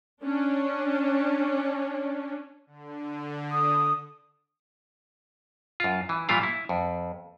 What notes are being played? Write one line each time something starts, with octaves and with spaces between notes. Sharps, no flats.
C#4 D4
D3
D#6
F#2 F4
E3
A#2 E3 G3 E4 F4 F5
E4
F2